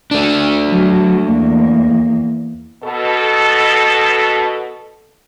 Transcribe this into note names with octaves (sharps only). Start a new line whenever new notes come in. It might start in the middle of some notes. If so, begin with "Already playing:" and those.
A3 D4
F#3
E2 A#3
B2 A4